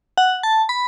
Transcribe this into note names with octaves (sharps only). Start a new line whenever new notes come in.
F#5
A5
B5